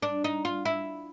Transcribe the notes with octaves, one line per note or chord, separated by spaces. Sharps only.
D4
D#4
F4
E4